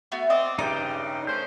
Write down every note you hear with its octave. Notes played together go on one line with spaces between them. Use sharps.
A3 B3 F#4
C4 D5 D#5
G2 C#3 D#4 D5 G5 D6
A3 C#4 C5 G6